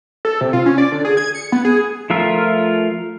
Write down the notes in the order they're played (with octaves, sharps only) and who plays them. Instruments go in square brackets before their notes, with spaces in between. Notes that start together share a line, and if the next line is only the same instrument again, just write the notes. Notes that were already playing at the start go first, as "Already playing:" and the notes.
[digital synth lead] A4
C3
F4
C#4
D5
D3
G#4
G#6
C#7
B3
G#4
[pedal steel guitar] F3 A3 F4 A#4 E5